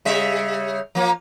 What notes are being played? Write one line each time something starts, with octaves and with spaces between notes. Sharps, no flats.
C#3 G3 E5
F3 A#3